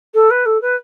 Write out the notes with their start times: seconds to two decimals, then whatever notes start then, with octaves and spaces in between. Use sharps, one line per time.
0.14 A4
0.30 B4
0.45 A4
0.61 B4